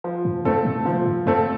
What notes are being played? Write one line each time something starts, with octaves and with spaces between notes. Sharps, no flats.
F3
G2
F2 A3 C4 A4
A2
C3 F3
G2
F2 A3 C4 A4